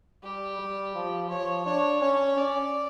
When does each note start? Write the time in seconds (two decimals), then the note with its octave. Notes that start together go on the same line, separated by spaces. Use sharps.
0.23 G3 G4
0.59 G3
0.95 F3
1.30 F3 C#5
1.66 D4 C#5
2.02 C#4 C#5
2.37 C#4 D5